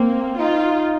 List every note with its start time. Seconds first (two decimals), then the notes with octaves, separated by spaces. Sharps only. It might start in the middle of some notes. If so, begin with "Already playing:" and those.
Already playing: A#3 C4
0.39 D#4 F4